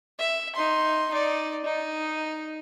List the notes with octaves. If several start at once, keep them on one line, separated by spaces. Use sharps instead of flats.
E5
D#4 C6
D#4 D5
D#4